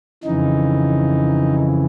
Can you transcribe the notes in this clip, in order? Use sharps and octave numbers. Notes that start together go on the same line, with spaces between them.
F2 C#3 E3 D#4